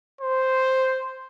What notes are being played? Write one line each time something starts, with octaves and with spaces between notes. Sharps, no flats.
C5